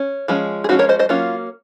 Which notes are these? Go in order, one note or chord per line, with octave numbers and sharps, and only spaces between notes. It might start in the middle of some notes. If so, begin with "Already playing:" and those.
Already playing: C#4
F3 G#3 C#4
G#4
F3 G#3 C#4 D#4 F#4
A#4 C#5
C5 D#5
C5 D#5
F#3 A#3 C#4 F4